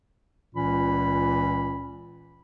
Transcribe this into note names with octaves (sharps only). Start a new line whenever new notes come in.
C#2 A#2 E3 C#4 B5